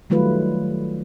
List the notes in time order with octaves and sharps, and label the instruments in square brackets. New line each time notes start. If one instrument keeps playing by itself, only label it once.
[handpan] D#3 F#3 G3 A3 F4 B4